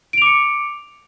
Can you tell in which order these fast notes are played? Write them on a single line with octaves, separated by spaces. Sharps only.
D7 F7 D6 C#7